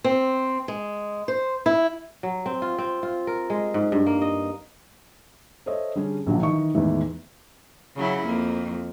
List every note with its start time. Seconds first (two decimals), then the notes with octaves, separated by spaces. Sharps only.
0.04 C4
0.68 G#3
1.28 C5
1.66 E4
2.23 F#3
2.46 C4
2.62 F4
2.78 C4
3.03 F4
3.27 A#4
3.50 G#3
3.74 G#2
3.92 G2
4.06 A#3
4.22 D#5
5.66 A4 C5 C#5 D#5 E5
5.95 D3 G3 C#4 G#4
6.27 A#1 A#2 D3 F3 F#3
6.42 D#3 E3 D#5 C#6
6.74 E2 A2 D#3 E3 G#3
7.96 C#3 F#3 E4
8.25 F2 A#3